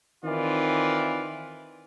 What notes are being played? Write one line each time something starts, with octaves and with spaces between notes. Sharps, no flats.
D#3 E3 C4 F4 D5